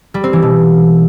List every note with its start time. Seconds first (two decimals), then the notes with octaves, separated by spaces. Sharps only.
0.14 G3
0.24 C4
0.33 E3
0.42 B2